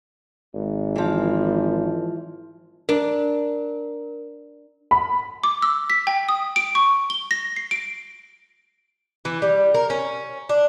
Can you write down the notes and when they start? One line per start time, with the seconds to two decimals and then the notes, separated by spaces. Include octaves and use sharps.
0.55 G#1
0.96 E3 F3
2.89 D4 A#4
4.91 B5
5.44 D6
5.62 E6
5.90 B6
6.07 G5
6.29 D#6
6.56 D7
6.75 C#6
7.10 G7
7.31 A#6
7.56 C7
7.71 D7
9.25 E3
9.42 G3
9.75 A#4
9.90 C#4
10.49 D4